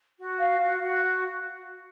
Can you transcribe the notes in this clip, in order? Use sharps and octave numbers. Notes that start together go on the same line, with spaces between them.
F#4
F5
F#4
F#4